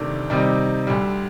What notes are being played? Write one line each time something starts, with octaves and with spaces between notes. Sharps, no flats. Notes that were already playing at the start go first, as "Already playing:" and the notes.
Already playing: D2 C3 D#3 A3 D4
C3 D#3 G3 C4 D#4 D5
D2 D3 G3